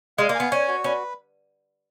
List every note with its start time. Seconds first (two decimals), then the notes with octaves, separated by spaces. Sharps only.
0.18 G#3 F5
0.29 A#3
0.35 B3 G#5
0.51 C#4 C#5
0.68 F#4
0.84 C#4 B4